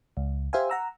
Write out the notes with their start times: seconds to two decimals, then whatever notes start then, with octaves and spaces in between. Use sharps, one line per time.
0.17 C#2
0.53 G4 C5 E5 F5 G#5
0.70 F#5 A#5 E6